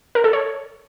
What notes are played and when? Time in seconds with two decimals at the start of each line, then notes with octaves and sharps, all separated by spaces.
0.15 A#4
0.24 A4
0.33 C#5